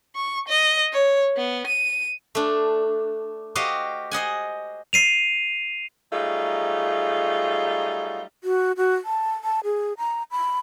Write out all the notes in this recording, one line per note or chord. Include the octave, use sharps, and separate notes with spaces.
C#6
D#5
C#5
B3
D#7
A3 D4
F#4 G4 C5 D#5 F5
C5 D#5 F#5 G#5
C7 D#7 F7
F#3 G3 A3 D#4 F4 G#4
F#4
F#4
A5
A5
G#4
A#5
B5